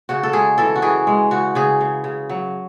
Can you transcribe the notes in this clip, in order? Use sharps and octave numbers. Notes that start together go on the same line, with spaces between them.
C#3 F#4
A4
G#3 G#4
E3 A4
F#4
E3 G#4
G#3
C#3 F#4
C#3 G#4
C#3
C#3
F#3